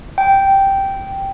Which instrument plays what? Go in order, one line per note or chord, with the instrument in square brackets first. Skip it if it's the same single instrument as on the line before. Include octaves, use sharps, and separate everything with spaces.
[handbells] G5